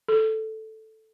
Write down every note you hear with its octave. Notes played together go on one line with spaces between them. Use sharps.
A4